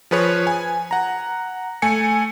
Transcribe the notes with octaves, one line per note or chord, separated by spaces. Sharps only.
F3 G#4 B4 C#5
G#5
F#5 A#5
A3 G#5 C#7